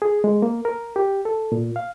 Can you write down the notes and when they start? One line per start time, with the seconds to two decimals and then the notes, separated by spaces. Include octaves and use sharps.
0.02 G#4
0.24 G#3
0.42 A#3
0.65 A#4
0.96 G4
1.25 A4
1.52 A#2
1.76 F5